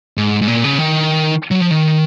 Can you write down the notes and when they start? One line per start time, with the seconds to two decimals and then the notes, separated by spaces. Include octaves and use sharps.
0.17 G#2
0.42 G#2
0.48 A#2
0.64 C#3
0.78 D#3
1.51 F#3
1.61 F3
1.71 D#3